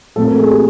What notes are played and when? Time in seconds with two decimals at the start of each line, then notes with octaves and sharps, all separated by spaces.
0.16 A#2 F3 A3 C4 A4
0.28 A#4
0.40 G#4
0.51 G4